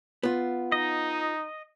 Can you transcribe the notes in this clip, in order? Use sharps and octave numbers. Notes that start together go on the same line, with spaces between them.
B3 F4
D#4 D#5